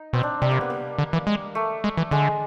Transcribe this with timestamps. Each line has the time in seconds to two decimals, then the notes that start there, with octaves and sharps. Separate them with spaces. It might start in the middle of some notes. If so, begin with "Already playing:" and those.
Already playing: D#4
0.13 B2 C4
0.23 D4
0.42 C3 G3
0.51 A#3
0.61 B3
0.70 A#3
0.98 D3
1.13 E3
1.27 G#3
1.55 A3
1.84 G#3
1.97 E3
2.11 D3 G#3